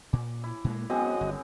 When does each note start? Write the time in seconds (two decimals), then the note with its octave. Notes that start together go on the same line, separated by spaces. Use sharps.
0.13 A#2 D6
0.44 E4
0.64 A#2 G#3 A#3
0.90 F#2 G#3 B3 C4 F#4 D#5
1.21 G1